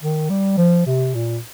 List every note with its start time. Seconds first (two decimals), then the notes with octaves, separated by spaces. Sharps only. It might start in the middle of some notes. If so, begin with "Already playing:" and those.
0.02 D#3
0.30 G3
0.58 F3
0.87 C3
1.15 A#2